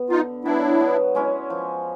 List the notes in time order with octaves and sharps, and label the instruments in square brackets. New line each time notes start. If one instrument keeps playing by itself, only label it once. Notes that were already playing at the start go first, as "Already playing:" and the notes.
Already playing: [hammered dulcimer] B2 B3
[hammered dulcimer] D3 [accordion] D#4 F4
[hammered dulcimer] F#3 B3 [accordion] D4 E4
[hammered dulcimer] B2
G#3 C#4 E4
F3